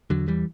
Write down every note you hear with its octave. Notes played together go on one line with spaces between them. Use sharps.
E2 D3 F#3
E3 G3